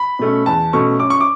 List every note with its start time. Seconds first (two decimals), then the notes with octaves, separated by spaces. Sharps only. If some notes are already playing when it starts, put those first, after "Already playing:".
Already playing: B5
0.19 B2 A3 C#4
0.46 E2 A5
0.73 B2 A3 C#4 C#6
1.00 F#2 D6
1.10 C#6
1.20 D6